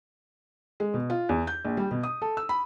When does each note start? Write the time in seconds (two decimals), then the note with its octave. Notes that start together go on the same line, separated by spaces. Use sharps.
0.80 G#3
0.94 B2
1.10 F4
1.29 E2
1.47 G6
1.65 A#1
1.77 G3
1.91 B2
2.03 D#6
2.22 A4
2.37 E6
2.49 B5